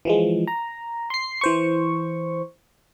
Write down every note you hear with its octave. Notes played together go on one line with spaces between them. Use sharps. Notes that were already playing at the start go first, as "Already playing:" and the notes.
E3 F3 G#3
A#5
C6 C7
E3 C5 C#6